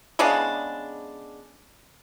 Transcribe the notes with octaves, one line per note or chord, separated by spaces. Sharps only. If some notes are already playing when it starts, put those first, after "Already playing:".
C#3 G#3 B3 D4